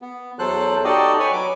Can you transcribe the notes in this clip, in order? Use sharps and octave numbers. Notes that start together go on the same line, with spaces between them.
B3
E2 F#3 A4 C5 F#6
D#4 F#4 G4 A4 D5 D#5
B4 C#5 G#5
F#3 D6